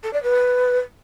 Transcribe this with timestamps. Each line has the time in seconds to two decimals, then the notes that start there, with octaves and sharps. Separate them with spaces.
0.04 A4
0.13 D5
0.23 B4